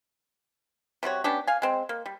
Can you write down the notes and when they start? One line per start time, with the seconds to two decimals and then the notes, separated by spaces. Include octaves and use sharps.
1.03 C3 G3 F#4 C#5
1.24 B3 C#4 D4 G4
1.47 F5 G#5
1.62 G#3 C4
1.89 A#3
2.06 G3